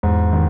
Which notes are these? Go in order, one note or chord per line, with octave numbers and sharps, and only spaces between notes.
E2 G#2
D#3